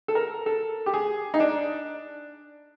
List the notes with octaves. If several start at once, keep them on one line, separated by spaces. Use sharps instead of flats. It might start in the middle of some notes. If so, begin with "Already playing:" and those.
A4
A#4
A4
G4
G#4
D#4
D4